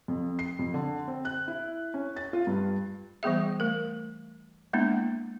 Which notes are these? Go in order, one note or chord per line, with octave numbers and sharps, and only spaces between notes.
F2
C7
F2
D3
C4
F#6
E4
C#4
A6
F4
G2
E3 G3 B3 G#4 E5
A3 A#4
G#3 A#3 B3 D4 E4